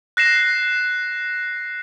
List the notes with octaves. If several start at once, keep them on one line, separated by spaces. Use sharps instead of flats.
F#6 A#6 C7 E7